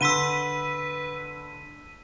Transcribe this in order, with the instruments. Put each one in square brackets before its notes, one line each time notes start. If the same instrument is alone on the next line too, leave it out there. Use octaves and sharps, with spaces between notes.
[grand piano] D3 C6 G7 [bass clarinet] B4 [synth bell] E6 B6 D#7